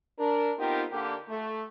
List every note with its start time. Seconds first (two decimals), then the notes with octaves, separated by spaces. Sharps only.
0.19 D4 A#4
0.58 B3 C4 D#4 F4 G4 A#4
0.91 D3 A#3 G4
1.29 A3